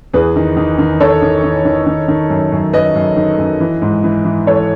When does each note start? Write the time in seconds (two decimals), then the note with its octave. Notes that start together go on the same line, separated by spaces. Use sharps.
0.13 E2 G#4 B4
0.36 D#3
0.57 D#3
0.79 D#3
1.00 D#3 A4 C#5
1.22 D#3
1.43 D#3
1.65 D#3
1.86 D#3
2.08 D#3
2.30 F#2
2.52 F#2
2.73 F#2 B4 D#5
2.96 F#2
3.17 D#3
3.39 F#2
3.60 E3
3.82 G#2
4.04 E3
4.25 E3
4.47 E3 A4 C#5